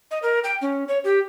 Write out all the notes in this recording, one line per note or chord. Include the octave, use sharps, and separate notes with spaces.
D#5
A#4
G5
C#4
C#5
G4